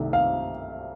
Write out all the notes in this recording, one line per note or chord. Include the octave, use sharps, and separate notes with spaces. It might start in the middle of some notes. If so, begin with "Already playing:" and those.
Already playing: C2 C3 D#3 A3
F5